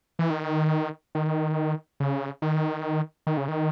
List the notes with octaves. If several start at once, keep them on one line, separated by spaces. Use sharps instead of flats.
E3
D#3
D#3
C#3
D#3
D#3
C#3
D#3